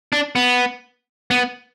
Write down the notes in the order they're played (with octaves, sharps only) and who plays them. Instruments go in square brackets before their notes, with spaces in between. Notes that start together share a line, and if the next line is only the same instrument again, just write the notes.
[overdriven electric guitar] D4
B3
B3